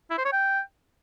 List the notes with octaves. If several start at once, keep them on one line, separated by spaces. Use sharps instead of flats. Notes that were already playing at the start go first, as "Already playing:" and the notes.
E4
C5
C#5
G5